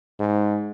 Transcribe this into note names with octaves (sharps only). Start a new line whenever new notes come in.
G#2